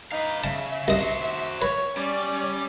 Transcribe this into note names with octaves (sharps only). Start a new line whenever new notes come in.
D#4 B4 F5
C#3 E5 A5
C2 F#4 C5 D#5
B4 C#5
G3 C#4 D5